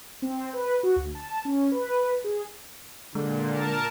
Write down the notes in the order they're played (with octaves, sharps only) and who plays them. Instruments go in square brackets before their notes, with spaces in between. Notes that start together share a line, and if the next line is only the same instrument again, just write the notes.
[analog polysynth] C4
B4
F#4
D2
A5
C#4
B4
G#4
[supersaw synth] A#2 [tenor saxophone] D3 [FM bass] G#3
[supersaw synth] A#4 A5